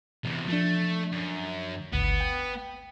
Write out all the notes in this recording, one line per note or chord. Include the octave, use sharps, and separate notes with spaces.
E2 C3
F3 A3 D4
F#2
G#1 D2 B3
G5